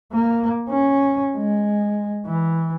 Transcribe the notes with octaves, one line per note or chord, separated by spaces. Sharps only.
A#3
C#4
G#3
E3